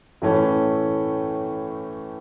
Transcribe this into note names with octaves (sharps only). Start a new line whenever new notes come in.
A2 E3 A3 C#4